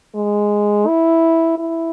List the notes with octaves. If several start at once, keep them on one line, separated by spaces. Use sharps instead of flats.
G#3
E4
E4